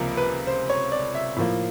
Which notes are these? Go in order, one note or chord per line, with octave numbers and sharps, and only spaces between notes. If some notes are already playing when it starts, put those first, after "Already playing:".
Already playing: C#2 C3 F3 A#3 A#4
B4
C5
C#5
D5
E5
A2 F3 A#3